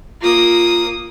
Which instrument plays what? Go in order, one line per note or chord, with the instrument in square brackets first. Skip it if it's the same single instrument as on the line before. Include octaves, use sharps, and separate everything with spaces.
[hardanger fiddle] A#3 D#6 [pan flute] F4